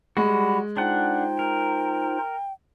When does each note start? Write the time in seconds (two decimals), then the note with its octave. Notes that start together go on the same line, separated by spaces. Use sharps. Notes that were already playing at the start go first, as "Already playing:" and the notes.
0.17 G3 G#3 F#4 B5
0.77 D4 D#4 F4 C5 F#5 G5
1.39 A#4